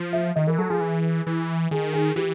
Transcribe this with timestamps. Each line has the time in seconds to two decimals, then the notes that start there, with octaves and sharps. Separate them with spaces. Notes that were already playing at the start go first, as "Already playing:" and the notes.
Already playing: F3
0.13 E5
0.36 D#3 D#5
0.47 E3 A#4
0.58 F#3 A4
0.69 F3 G#4
0.81 E3
1.27 E3
1.71 D#3 G#4
1.93 G#4
2.16 E3 G4